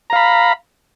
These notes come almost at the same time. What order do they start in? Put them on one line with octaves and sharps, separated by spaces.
A#5 F5 B5